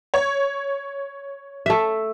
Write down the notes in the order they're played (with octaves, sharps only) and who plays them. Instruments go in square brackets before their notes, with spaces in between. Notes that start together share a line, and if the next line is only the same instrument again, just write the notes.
[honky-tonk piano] C#5
[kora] A3 E5